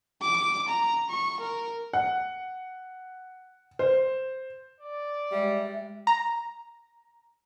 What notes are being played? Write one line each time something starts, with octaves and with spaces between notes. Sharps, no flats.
D6
A#5
C#6
A#4
F#5
C5
D5
G3 G#3 E5
A#5